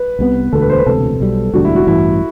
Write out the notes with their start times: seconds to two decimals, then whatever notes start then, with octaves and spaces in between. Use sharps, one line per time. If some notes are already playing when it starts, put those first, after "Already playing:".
Already playing: B4
0.19 C2 C3 G3 B3
0.53 E1 D2 D3 A4
0.61 B4
0.70 C5
0.78 B4
0.86 E1 D2 C3 A4
1.20 B1 B2 G3
1.53 E1 D2 D3 G3 F#4
1.65 E4
1.76 F#4
1.87 A1 G2 E3 E4